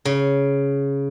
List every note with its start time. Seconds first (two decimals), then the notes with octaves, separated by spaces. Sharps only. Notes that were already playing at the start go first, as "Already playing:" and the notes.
0.05 C#3